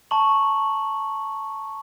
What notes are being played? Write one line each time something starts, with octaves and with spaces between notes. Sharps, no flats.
A5 A#5 C#6 F#7